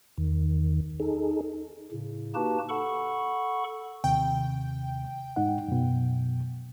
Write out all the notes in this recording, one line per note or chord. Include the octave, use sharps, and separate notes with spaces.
E2 D#3
D#4 G#4 A4
A2 C#3
A#3 D#4 F#4 G4 B4 A5
A4 F#5 B5 C#6
D#2 C3 G5
G#2 D#4 F#5
F#2 B2